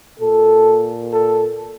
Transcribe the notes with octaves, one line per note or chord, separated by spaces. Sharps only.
A#2 A4
A4